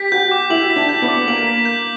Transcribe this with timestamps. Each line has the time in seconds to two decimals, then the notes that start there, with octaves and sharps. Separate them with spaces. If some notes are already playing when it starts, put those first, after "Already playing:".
Already playing: G4 B6
0.12 F#4 G6
0.31 D6
0.50 E4 F#7
0.70 B6
0.76 D4
0.89 G6
1.02 B3
1.08 D6
1.28 A#3 F#7
1.47 B6
1.65 G6